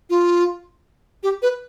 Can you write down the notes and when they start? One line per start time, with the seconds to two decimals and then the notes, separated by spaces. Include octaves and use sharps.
0.10 F4
1.23 G4
1.42 B4